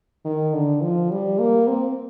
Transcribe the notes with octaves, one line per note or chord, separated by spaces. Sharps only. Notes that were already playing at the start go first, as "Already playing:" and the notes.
D#3
D3
F3
G3
A#3
C4